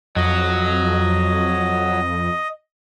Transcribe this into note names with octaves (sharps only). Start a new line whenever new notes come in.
F2 F#3 D#5